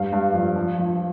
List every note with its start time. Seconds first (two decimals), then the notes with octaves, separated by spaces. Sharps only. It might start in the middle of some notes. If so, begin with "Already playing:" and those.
Already playing: G2 F5
0.12 G2
0.34 F3
0.56 F3
0.79 F3